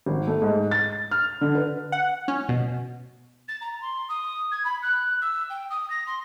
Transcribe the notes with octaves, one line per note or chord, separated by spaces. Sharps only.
G#1
A3
G#2
A6
F6
D3
B4
F#5
C#4
B2
A6
A#5
C6
D#6
G#6
B5
F#6
E6
G5
D#6
A#6
C6